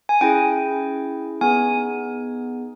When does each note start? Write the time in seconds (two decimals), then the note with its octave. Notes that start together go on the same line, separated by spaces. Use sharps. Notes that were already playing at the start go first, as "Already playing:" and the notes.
0.09 G#5
0.21 C#4 E4 G#4 G5
1.41 B3 D#4 G#4 G#5